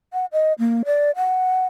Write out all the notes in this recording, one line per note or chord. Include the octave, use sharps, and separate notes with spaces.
F#5
D#5
A#3
D5
F#5